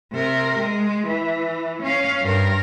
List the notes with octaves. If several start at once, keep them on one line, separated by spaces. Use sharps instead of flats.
C3 A#4
G#3
E3
C#4 F5
G2 A#4